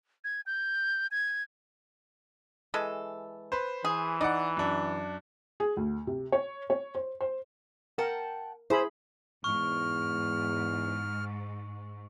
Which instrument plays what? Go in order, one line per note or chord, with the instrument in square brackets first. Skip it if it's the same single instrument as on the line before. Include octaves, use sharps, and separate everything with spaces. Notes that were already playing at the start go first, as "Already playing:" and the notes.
[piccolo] G#6
G6
G#6
[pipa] E3 G#3 A4
[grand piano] B4 C5
[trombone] E3 [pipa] G#4
[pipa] D#4 [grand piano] D5 F#5
[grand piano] F#2 D4
[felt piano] G#4
D2
C3
C#5
C#5
C5
C5
[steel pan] A#4 [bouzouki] F#5 G5 A5
[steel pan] E4 G#4 B5 [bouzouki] C5
[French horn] E2 [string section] G#2 [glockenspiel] C#6 [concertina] F6